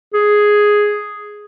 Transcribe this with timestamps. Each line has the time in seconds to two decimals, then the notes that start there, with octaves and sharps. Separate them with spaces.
0.14 G#4